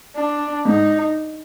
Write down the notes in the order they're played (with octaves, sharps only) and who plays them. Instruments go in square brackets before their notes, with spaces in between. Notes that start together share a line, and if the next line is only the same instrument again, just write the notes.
[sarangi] D4
[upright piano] G#2 [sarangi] D#4